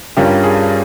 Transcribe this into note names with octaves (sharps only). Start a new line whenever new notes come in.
G2 G3 C#4 F4 G4 A#4
G#4